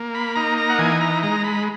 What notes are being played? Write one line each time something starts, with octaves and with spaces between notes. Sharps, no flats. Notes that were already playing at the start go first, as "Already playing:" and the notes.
Already playing: A#3
B5
D#4 A#5
A#5
F#5
E3 G#5
A#5
G#3 A#5
B5